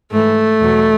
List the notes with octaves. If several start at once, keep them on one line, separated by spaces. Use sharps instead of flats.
G#2 E3 A3
E2 B2 F#3